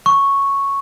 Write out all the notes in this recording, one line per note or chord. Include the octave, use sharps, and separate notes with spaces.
C#6